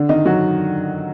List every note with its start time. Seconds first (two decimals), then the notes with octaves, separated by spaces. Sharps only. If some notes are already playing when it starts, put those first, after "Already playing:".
Already playing: D3 D4
0.09 D#3 D#4
0.25 F#3 F#4